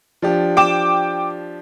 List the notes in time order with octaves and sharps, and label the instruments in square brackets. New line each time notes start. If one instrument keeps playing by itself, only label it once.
[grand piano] F3 D4 G4
[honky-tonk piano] G5 D6 E7